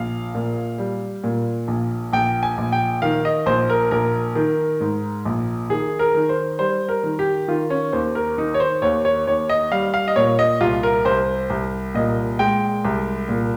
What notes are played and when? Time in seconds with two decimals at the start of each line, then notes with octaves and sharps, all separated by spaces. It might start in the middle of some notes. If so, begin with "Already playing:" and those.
Already playing: A#1 F5
0.35 A#2
0.78 G3
1.24 A#2
1.68 A#1
2.13 A#1 G5
2.43 G#5
2.58 A#1
2.72 G5
3.02 D#3 F5
3.25 D#5
3.46 A#1 C5
3.70 A#4
3.91 A#1 A#4
4.35 D#3
4.80 G#2
5.25 A#1
5.70 D#3 G#4
5.99 A#4
6.14 D#3
6.29 C5
6.59 G3 C5
6.89 A#4
7.03 D#3
7.19 G4
7.48 D#3 F4
7.70 C#4
7.93 D#2 C5
8.15 A#4
8.37 D#3 D#4
8.54 C#5
8.60 C5
8.82 D#2 C#5
9.05 C#5
9.27 D#2 C#5
9.49 D#5
9.72 G3 F5
9.94 F5
10.08 D#5
10.16 A#2 C#5
10.39 D#5
10.61 C2 F4
10.83 A#4
11.05 C2 C5
11.50 C2
11.95 A#2 D#5
12.39 G#3 G5
12.85 C2
13.29 A#2